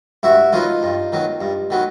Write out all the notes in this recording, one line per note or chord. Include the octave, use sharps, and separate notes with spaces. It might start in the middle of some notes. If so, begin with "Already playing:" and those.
G2 E4 F#4
D#3 F#3 B3 D#4 F4
G2
D#3 F#3 B3
G2
D#3 F#3 B3